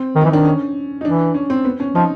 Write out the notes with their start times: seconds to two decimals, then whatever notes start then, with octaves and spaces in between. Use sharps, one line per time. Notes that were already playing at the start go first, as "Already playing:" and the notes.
Already playing: C4
0.16 D#3
0.21 E3 D#4
0.30 D#3 D4
0.45 C#4
1.01 D#4
1.05 E3 D4
1.34 C#4
1.50 C4
1.65 B3
1.80 C#4
1.95 F3 D#4